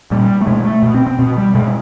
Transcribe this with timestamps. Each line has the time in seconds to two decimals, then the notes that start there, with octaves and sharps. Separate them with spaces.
0.11 A#2 G3
0.41 A3
0.47 B2 G#3
0.65 A3
0.83 B2
0.94 C4
1.07 C4
1.19 B2
1.37 G3
1.55 B2 G#3